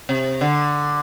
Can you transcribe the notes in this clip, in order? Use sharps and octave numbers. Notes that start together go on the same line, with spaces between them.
C3
D3